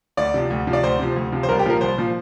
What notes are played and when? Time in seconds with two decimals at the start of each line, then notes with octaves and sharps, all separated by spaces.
0.17 D2 D5
0.34 C3 F3
0.50 D2
0.67 C3 F3
0.73 D5
0.83 D2 C5
0.99 C3 F3
1.16 D2
1.32 C3 F3
1.43 C5
1.48 C2 A#4
1.59 G4
1.65 A#2 F3 A#4
1.81 C2 C5
1.98 A#2 F3